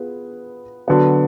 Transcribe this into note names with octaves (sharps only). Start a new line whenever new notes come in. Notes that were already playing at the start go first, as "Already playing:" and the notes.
Already playing: B3 F4 G#4 B4
D3 F#3 B3